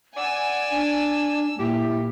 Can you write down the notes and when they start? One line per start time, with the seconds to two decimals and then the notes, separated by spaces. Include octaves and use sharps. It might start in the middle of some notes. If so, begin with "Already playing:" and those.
0.17 D5 F#5 G#5 E6
0.71 D4
1.59 A#2 E4 G4